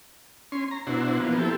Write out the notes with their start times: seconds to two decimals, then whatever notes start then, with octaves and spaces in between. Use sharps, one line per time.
0.52 C#4 C6
0.71 A#5
0.87 B2 D4 E4 F#4 C5
1.20 E3 F3 A#3 B3
1.38 C4 E4 G4 A4